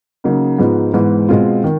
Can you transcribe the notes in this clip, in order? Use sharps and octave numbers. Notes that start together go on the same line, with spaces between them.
C#3 F#3 A#3 D#4
G#2 F3 G#3 B3 D#4
G#2 E3 G#3 B3
B2 G#3 C4 F4
D#3